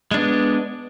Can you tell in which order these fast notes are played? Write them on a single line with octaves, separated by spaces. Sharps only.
G#3 D4 B3